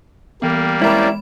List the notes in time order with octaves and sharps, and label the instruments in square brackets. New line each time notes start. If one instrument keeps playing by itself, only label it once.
[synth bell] E3 B3 [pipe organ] G3 A#3
[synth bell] G#3 B5 E7 [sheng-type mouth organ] C4 C#4 D5 [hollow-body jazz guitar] E4 A#4